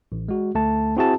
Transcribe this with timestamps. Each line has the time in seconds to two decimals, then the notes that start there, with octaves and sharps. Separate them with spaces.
0.12 A1
0.28 G#3 F#4
0.55 D2 A3 A5
0.97 C4 E4 F#4 G#4 E5 A5